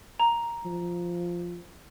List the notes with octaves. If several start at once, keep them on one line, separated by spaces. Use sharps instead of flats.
A#5
F3